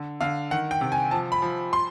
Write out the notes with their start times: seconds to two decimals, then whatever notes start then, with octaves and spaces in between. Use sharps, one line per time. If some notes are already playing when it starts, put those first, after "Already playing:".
Already playing: D3
0.21 D3 F5
0.51 D#3 F#5
0.71 G5
0.81 C3
0.92 G#5
1.11 F3 A5
1.32 B5
1.42 F3
1.73 C6